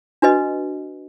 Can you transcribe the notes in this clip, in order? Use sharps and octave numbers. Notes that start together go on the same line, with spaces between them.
D4 F#4 B4 D#5